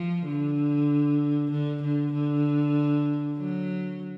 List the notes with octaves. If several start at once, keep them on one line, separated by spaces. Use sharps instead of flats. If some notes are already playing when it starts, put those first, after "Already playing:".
Already playing: F3
D3
D3
D3
D3
F#3